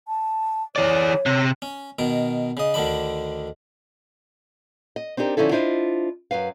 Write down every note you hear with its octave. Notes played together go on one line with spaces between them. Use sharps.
A5
E3 C#5 D5
C3
C#4
B2 D#3 A#4
C#3 D#5
D2 D3 D#3 D4 B5
D#5
C4 D4 D#4 G4 A#4
D3 F3 C#4 D#4 E4 A4
D4 E4 F4 C5 C#5 D#5
F#2 C#3 B4 F5